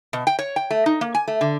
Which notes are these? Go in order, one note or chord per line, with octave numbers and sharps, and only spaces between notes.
B2
G5
C#5
G5
A3
D#4
A#3
G#5
A3
D3